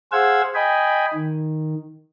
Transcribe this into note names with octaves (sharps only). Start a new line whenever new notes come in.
G#4 C5 F5 F#5 E6 G#6
D#5 G5 G#5 B5
D#3